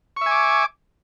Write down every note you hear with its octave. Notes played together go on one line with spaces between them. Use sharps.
E5 G#5 C#6 D6